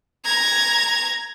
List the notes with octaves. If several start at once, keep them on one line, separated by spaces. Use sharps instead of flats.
A#5 G#6